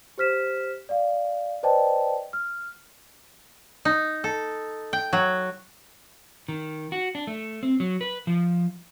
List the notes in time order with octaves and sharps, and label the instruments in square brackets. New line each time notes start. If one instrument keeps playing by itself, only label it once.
[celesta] G4 C5 F6 B6 E7
D5 F5
B4 C5 D5 D#5 G5 A5
F6
[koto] D#4
A4
G5
F#3
[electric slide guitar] D#3
F#4
D4
A3
C4
F#3
B4
F3